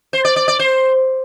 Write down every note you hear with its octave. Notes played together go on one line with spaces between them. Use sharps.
C5
D5
D5
D5
C5